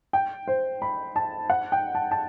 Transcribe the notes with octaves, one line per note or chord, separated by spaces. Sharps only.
G5
C5
B5
A5
F#5
G5
A5
A5